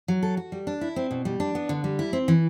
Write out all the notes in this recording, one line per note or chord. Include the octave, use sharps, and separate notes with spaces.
F#3
A4
F#4
G3
D4
E4
C4
B2
G3
D4
B3
D3
G3
E4
C4
E3